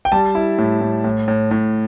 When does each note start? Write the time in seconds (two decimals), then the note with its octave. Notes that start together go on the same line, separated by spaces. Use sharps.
0.05 G5
0.12 G3 A5
0.35 E4
0.58 A2
0.81 A2
1.04 A2
1.28 A2
1.51 A2